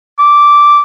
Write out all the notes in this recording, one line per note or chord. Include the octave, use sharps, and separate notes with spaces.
D6